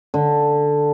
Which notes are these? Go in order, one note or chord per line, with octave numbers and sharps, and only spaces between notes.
D3